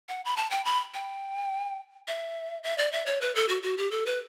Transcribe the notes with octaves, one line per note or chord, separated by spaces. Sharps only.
F#5
B5
A5
G5
B5
G5
E5
E5
D5
E5
C#5
B4
A4
F#4
F#4
G4
A4
B4